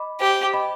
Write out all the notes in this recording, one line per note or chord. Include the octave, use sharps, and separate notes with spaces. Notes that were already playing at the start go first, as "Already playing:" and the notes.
Already playing: D#5 B5 D6
G4 C5
D#5 B5 D6